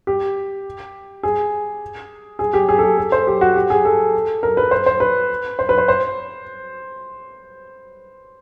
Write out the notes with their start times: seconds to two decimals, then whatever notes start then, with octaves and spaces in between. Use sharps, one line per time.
0.07 G4
1.23 G#4
2.39 G#4
2.54 G4
2.69 G#4
2.78 A4
2.83 G#4
2.97 A4
3.12 C5
3.27 G4
3.41 F#4
3.56 G4
3.70 G#4
3.85 A4
4.43 A#4
4.57 B4
4.71 C5
4.86 C5
5.00 B4
5.59 C5
5.69 B4
5.78 C5
5.88 C5